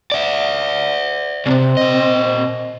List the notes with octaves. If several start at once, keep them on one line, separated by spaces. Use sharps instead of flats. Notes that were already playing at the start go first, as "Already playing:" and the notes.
D5 E5
C2 C3 C4
A#2 D#5